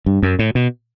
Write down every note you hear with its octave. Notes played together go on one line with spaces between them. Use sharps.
G2
F#2
A2
B2